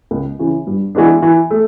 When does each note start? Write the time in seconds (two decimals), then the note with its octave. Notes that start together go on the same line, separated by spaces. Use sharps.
0.11 C#2
0.39 C#3 E3
0.67 G2
0.95 E3 G#3 B3 D4
1.22 E3
1.51 A3